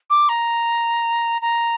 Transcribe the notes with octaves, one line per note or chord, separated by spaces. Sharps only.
D6
A#5
A#5